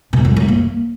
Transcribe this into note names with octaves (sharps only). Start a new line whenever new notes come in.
B2
F#2
F#3
A#3